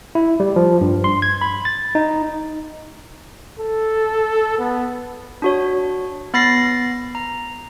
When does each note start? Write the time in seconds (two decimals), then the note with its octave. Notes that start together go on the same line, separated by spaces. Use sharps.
0.15 E4
0.40 G3
0.56 F3
0.81 G2
1.04 C6
1.22 G#6
1.41 B5
1.65 A6
1.95 D#4
3.60 A4
4.59 B3
5.42 D4 F#4 C#5
6.34 B3 B5 A6 A#6 C7
7.15 A#5